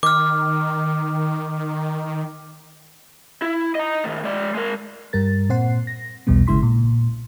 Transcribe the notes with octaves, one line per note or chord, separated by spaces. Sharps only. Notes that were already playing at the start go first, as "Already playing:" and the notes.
D#3 D6 F6
E4
D#5 A#5
A2 D#3
G#3 D5
G#3 A#4
G2 G3 A#4 A6
A#2 C4 C5 F#5 C7
A#6
B1 E2 B2 G3 B3
G#1 C#3 G#3 E4 C6 B6
A#2